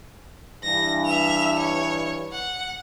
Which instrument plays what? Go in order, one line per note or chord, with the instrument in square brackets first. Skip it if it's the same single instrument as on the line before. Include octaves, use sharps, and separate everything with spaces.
[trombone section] G2 E3 [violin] A#6
[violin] E5 F7
C#5
F#5